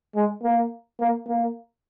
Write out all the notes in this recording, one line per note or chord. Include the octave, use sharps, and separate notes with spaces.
G#3
A#3
A#3
A#3